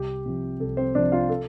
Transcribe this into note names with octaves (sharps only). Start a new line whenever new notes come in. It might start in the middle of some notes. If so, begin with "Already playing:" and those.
Already playing: C2 G4
C3 F3
C2 A4
C4 C5
C3 F3 D4 D5
F4 F5
A4